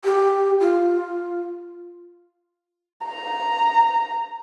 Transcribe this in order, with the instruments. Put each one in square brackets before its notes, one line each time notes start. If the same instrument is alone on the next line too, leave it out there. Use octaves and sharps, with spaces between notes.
[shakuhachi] G4
F4
[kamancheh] A#5